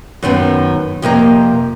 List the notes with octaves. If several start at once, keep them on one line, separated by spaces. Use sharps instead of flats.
F#2 D#3 B3 C4
F2 C3 A#3 A#4